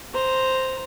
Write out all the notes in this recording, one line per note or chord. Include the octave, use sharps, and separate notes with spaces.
C5 A#5